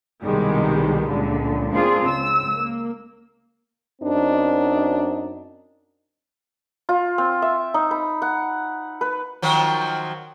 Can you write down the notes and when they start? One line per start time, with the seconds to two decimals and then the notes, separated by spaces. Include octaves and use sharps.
0.23 C2 B2 D#3 G3 G#3
1.10 C#2 A#2 D3
1.71 A#3 C4 D4 F4 G#4
2.03 C#2 E6
2.55 A#3
4.02 F#2 C4 D4 D#4
6.89 F4
7.18 C4
7.42 E5
7.74 D#4
7.91 B5
8.22 F#5
9.01 B4
9.42 D#3 F3 F#3